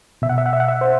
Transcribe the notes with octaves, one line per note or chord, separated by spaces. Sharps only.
B2 E5
F#5
E5
F#5
E5
F#5
E5
C5